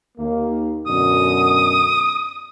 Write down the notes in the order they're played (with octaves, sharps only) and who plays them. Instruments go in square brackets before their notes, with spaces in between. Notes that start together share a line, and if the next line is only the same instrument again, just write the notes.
[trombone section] D#2 A#3
[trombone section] F#2 B2 D3 [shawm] D#6